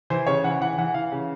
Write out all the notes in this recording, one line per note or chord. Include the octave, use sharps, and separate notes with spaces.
E3 C5
C#3 C#5
E3 F#5
E3 F#5
E3 F#5
E3 F5
C#3